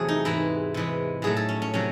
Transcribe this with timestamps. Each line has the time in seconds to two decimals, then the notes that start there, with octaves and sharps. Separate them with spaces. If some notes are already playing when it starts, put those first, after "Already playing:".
Already playing: E2 C3 F#3 A3 C4 F#4 G#4
0.08 D#4
0.25 G#2 E3 G#3 E4
0.74 C3 E3 G#3
1.22 A2 F#3 A3 G#4
1.37 A4
1.49 C#4
1.62 C#4
1.74 C3 F#3 C#4